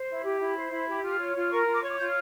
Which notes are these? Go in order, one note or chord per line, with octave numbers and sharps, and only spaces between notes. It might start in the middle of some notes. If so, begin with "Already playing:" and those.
Already playing: C5
E4
G4
E4
C5
E4
G4
F4
C#5
F4
A#4 C#6
F4
D6
C#5 C#6
D6
F4 G6